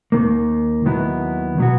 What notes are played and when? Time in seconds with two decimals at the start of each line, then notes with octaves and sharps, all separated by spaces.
0.12 D#2 D#3 A#3
0.85 D#2 D#3 F#3 B3 E4
1.58 B2 F#3 B3 F#4